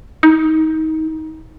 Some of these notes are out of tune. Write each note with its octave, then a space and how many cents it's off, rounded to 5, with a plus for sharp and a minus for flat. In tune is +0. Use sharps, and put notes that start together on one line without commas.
D#4 +25